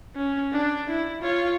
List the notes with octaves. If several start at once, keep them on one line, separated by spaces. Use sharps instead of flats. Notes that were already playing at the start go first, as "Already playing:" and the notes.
C#4
D4
E4
F4 C#5